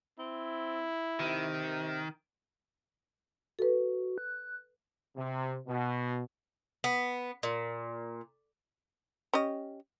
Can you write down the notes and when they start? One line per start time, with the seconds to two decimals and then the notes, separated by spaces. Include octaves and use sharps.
0.19 C4 E4
1.20 C3 D#3
3.59 F#4 A4 B4
4.18 F#6
5.17 C3
5.67 B2
6.84 B3
7.43 A#2
9.33 C#4 G4 D#5